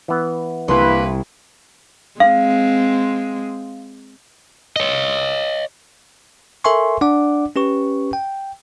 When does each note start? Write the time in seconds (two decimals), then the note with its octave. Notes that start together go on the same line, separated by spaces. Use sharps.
0.08 E3 B3
0.68 C2 A#3 E4 B4 C6
2.20 G#3 C4 F5
4.76 C#5 D#5
6.64 A4 A#4 E5 G#5 C6 C#6
7.01 D4 D5 F#5 D6
7.56 C#4 G4 B4 C#6
8.13 G5